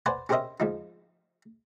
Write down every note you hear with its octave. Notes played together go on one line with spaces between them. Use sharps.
B4 C5 D5 F#5 G#5
C#4 G4 A#4 C5 D#5 E5
G#2 F3 D#4